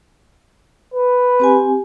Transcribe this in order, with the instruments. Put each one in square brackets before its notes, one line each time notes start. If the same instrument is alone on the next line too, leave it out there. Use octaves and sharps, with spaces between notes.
[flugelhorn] B4
[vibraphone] C4 G4 G#5